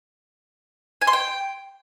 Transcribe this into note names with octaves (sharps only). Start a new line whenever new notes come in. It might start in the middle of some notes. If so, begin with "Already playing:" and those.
G#5
C6
G5